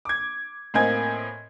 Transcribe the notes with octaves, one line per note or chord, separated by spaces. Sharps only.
D6 G#6
A2 A#3 C4 D#5 G#5 G#6